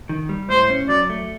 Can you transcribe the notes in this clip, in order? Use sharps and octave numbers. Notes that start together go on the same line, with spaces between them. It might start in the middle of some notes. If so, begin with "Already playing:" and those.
D#3
G3
A2 C5
C#4
F#3 D5
A3